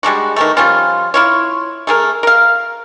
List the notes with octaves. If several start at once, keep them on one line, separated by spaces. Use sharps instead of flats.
G3 G#3 D4 F#4
D#3 E3 A3
F3 G3 C#4 F4
E4 F4 C#5
A3 G#4 A#4
A#4 F5